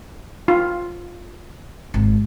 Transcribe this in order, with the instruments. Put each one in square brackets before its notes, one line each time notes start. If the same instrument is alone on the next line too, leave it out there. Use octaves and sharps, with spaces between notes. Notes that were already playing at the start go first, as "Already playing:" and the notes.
[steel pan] F4
[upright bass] G#1